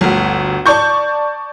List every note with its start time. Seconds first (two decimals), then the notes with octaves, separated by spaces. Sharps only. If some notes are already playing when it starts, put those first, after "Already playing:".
0.01 G1 D2
0.66 D5 A5 C#6 G6